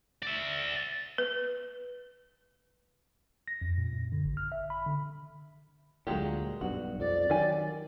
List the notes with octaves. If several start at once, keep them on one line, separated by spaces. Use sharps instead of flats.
D5 E5
B4
A#6
F2
A#2
F#2
D3
G#1
F6
E5
B5
D3
D2 A#2 F#3 G#3 G4
B1 G2 F#4
F2 D5
D#3 F#3 G4 G#5